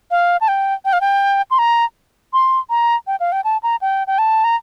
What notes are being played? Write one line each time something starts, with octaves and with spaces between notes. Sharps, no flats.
F5
A5
G5
G5
F5
G5
C6
A#5
C6
A#5
G5
F5
G5
A5
A#5
G5
G5
A5
A#5